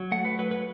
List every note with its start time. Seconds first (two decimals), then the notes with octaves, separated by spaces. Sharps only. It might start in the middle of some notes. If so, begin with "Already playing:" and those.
Already playing: F#3
0.12 A3 F#5
0.25 B4
0.39 F#3 B4
0.51 B4